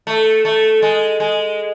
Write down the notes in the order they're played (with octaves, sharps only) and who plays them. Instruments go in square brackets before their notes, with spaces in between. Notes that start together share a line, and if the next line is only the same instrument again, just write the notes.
[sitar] A3
A3
G#3
G#3